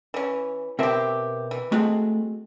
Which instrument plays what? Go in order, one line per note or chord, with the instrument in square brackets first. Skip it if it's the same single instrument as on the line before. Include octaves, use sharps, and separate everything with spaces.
[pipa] E3 C#4
[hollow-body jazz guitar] B2 A#4 E5 [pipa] C4 G4
[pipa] E3
[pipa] G#3 C4 [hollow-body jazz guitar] A3 F#4